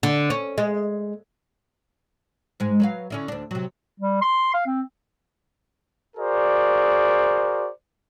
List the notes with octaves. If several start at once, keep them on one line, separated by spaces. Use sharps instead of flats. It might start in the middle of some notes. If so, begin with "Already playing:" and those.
D3
C#4
G#3
G#2 G#3
F#3 B4 F5
D3 C#4 E4
D2 D4
C3 F#3
G3
C6
F5
C4
F#4 G#4 A#4 C5 D5